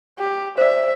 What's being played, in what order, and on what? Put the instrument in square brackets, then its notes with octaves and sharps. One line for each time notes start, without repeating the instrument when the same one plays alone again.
[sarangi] G4
[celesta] C5 D5 [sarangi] E5